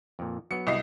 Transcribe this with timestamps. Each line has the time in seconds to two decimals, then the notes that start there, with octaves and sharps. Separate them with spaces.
0.19 F2 A#2
0.51 F#3 B3 C#7
0.67 C2 D#5 C7